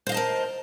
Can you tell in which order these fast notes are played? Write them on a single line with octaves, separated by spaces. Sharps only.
C5 F5 D#5 A5 A#4